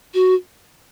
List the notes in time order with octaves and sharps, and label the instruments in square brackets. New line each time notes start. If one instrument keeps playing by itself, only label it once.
[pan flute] F#4